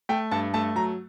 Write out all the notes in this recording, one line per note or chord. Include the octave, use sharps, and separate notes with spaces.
A3 G5
G2 A5
A3 A5
F#3 A#5